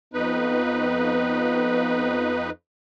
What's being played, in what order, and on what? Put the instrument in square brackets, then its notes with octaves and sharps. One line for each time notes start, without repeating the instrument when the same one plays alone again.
[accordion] F2 D#4 B4 [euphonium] B3